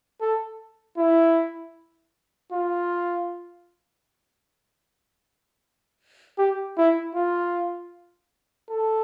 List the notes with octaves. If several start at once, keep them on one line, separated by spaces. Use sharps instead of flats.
A4
E4
F4
G4
E4
F4
A4